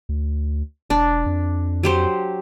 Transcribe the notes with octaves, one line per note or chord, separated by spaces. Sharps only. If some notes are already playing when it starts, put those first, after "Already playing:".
D2
E1 D4
F2
F#3 G4 C5